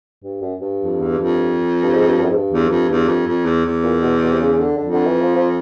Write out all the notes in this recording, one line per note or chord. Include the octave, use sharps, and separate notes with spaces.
G2
F#2
G2
F2
E2
F2
G2
G#2
G2
G2
F#2
G#2
G2
E2
F2
E2
F2
F2
E2
E2
A#2
B2
B2
C3
C#3
C#3
D3
F2 D3
D3
E3
F3
F3